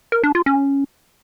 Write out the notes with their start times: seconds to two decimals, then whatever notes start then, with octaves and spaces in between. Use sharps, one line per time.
0.12 A#4
0.23 D4
0.35 F4
0.46 C#4